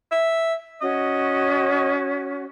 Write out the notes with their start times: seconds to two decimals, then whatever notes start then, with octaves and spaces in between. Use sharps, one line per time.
0.12 E5
0.82 C#4 F#4 D#5